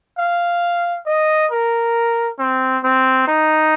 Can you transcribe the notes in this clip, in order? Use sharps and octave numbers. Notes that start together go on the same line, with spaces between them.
F5
D#5
A#4
C4
C4
D#4